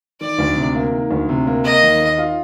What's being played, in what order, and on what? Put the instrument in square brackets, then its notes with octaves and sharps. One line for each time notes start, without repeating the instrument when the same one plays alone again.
[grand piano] D#3 [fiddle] D5
[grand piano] D2
C3
A#3
D#3
D2
C3
A#3
[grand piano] A#3 [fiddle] D#5
[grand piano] D#2
D#3
F4